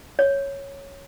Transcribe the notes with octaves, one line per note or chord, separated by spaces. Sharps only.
C#5